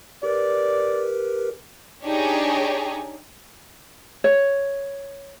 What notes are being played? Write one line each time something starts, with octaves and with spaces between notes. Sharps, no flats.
G4 A#4 B4 D5
D4 D#4 G4 G#4 C#5
C#5